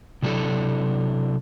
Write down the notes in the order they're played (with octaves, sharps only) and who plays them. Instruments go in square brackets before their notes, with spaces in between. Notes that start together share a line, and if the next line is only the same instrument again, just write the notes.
[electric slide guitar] C3 F#3 D4 E4 A4